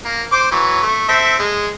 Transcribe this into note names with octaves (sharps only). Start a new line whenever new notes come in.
A#3
C5 D6
E3 F#3
A3
C4 A4 E5
G#3